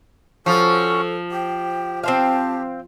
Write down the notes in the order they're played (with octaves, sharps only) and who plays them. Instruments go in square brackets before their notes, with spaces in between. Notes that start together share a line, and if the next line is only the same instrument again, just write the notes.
[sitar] F3 [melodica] C#4 F#4 C#6 [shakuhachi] A4
[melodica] G4 [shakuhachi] G5
[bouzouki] C4 C5 F5 [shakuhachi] A5